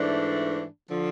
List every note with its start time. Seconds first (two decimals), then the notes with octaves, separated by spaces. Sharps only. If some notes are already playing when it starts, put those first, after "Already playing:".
Already playing: G#2 E3 A3 D4
0.89 D3 F3